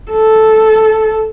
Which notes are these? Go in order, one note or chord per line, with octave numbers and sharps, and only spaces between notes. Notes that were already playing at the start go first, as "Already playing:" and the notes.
A4